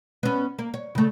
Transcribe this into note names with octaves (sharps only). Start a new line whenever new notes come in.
B3 C#4
A#3
C#5
C#3 A3